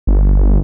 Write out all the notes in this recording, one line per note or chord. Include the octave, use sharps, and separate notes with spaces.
G1